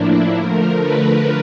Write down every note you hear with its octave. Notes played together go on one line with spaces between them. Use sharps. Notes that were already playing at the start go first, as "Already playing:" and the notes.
Already playing: A2 F3 A#3 D4 E4
D3 F3 A3 A#4
B4